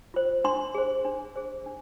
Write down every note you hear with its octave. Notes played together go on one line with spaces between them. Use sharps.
F4 C5
D4 C6
G#4 C5
D4
G#4 C5
D4